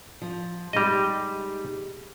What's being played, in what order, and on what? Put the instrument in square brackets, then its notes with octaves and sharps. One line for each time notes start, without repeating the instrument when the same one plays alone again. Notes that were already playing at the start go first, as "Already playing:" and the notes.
[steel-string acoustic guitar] F3
[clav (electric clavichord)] G3 D#5 [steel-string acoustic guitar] G#3 D#4 G4